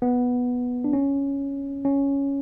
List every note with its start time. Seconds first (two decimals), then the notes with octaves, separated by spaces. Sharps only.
0.02 B3
0.84 D4
0.93 C#4
1.85 C#4